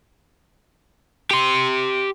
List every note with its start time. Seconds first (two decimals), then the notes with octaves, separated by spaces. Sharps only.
1.31 G4 C6